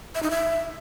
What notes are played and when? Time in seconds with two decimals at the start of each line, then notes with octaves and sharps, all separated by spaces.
0.15 E5
0.23 D#4
0.30 E5